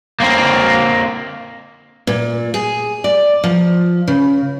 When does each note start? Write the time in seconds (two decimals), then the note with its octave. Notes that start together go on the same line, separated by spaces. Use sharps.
0.20 A#3 C4
2.07 A#2
2.54 G#4
3.04 D5
3.44 F3
4.08 C#3